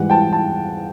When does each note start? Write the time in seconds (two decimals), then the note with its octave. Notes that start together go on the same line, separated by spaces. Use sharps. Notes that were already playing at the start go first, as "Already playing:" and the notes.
Already playing: G#2 E3 G3 F#5
0.10 G5 A5
0.33 A5